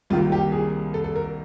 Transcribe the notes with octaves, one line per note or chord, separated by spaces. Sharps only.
C2 C3 D#3 G3 A#3 F4
G4
G#4
A4
A4
A#4